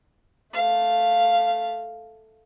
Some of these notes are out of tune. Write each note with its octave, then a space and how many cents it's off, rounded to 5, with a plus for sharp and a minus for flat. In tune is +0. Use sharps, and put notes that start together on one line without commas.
A3 +0 F5 +0